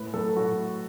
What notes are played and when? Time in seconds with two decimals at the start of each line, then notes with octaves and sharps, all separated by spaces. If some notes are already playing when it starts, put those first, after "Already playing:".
Already playing: A2 B4
0.14 F#3 A3 A4
0.36 A2 F#4